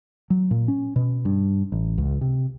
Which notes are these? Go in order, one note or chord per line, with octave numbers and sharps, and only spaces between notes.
F#3
A#2
C#4
B2
G2
A1
C#2
C3